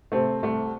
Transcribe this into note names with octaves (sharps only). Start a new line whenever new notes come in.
C3 A3 C4
C2 A3